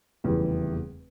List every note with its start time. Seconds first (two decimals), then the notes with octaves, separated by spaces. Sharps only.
0.24 F1 E2 C#3 E3 G3